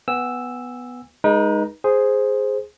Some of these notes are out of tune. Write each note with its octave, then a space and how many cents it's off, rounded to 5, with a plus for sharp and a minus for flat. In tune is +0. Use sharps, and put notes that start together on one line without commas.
B3 +0 G#5 -35 E6 +0
G#3 +0 D#4 +0 B4 -40
G#4 +0 C5 +0